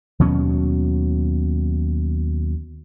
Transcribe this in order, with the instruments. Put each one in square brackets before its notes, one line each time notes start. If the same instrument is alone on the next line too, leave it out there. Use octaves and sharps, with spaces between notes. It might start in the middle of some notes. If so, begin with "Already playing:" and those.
[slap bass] D#2 B2 F#3 C#4